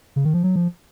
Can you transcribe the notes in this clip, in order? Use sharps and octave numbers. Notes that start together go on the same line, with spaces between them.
C#3
D#3
F3
F#3
F3